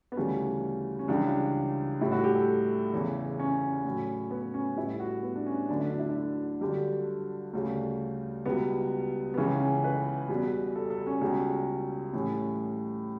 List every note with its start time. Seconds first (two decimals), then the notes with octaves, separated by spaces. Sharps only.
0.12 B3
0.17 D2 C#3 E3 G3 C#4
0.99 C#4
1.08 C#2 C#3 E3 G3 D4
2.01 A2 G3 E4
2.12 F#4
2.24 G4
2.35 A4
2.93 E2 C#3 E3
3.39 C#4
3.85 A2 F#3
4.31 B3
4.54 C#4
4.76 A2 G3 E4
5.00 F#4
5.23 B3
5.36 D4
5.46 C#4
5.69 D2 D3 F#3 D4
5.80 E4
5.90 D4
5.99 E4
6.09 D4
6.61 G2 D3 F#3 G4
7.53 D2 C#3 G3
8.45 C#2 B2 G3 B3
9.34 B3
9.38 C#2 C#3 E3 C#4
9.60 C#4
9.84 B4
10.29 E2 B2 G3
10.76 A4
10.90 A4
11.07 C#4
11.21 C#2 B2 G3
12.13 A2 E3 G3 C#4